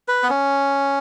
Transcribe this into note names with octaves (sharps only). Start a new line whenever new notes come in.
B4
B3
C#4